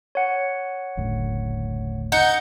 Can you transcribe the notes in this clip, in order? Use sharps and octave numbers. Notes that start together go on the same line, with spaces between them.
C#5 F#5
F#1 D2 A2
D#4 F#5 G6 C#7